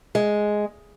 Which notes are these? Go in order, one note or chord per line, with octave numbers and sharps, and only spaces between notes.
G#3